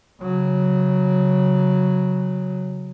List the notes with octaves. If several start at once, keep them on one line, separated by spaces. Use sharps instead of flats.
C#3 F#3